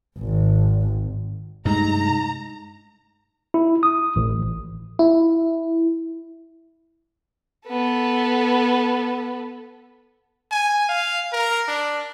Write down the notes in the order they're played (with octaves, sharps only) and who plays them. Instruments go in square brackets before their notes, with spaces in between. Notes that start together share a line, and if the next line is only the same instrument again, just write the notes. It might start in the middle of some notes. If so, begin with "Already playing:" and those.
[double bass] G#1
[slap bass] G2 C3 A3 [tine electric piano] G#3 D#4 [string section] A#5
[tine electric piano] E4
D#6
A1
[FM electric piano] E4
[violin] B3 A4
[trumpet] G#5
F5
A#4
D4